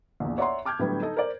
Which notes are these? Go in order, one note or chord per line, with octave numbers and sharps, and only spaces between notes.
A#1 E2
C#5 D5 E5 F#5 A#5 C6
A5 D6 F6 G6 G#6
A2 D3 F#3 G3 B3
D#4 A4 D#5
A#4 C5 D5